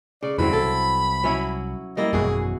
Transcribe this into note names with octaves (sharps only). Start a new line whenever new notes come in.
C#3 D5
E2 G2 D3 E3 F#3 C4 B5
C2 A4
F#3 C#4 E4
G3 A#3 E4 D#5
G#1 F#2 B2 E3 F#4 G#4